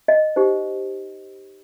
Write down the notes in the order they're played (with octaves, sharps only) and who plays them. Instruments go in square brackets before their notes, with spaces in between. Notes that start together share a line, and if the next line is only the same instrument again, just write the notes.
[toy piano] D#5
D#4 G4 C5